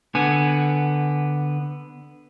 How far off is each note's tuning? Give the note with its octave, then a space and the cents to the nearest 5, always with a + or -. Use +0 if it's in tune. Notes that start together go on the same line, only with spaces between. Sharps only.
D3 +0 B3 +0 G#5 +0